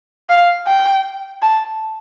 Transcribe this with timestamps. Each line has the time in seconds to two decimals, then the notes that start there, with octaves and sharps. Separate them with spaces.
0.30 F5
0.67 G5
1.42 A5